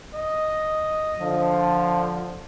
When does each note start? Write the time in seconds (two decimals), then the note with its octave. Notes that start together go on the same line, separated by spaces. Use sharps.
0.14 D#5
1.20 D3 F3